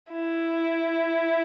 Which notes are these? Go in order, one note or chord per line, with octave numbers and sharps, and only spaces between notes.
E4